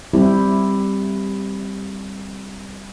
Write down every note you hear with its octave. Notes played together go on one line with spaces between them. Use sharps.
G3 C4 E4 G4